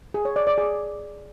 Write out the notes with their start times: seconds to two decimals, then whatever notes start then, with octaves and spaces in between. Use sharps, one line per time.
0.14 G#4
0.25 C#5
0.36 D5
0.47 D5
0.58 G#4